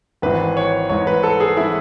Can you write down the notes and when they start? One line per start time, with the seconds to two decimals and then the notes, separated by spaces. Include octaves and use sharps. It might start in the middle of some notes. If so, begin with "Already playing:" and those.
0.22 G#1 G#2 E3 B4
0.57 C#5
0.90 G#1 G#2 E3 C#5
1.07 B4
1.23 A4
1.40 G#4
1.57 E3 E4